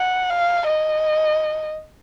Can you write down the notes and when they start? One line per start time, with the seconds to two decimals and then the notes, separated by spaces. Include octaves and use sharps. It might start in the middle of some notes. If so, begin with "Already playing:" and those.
Already playing: F#5
0.30 F5
0.67 D#5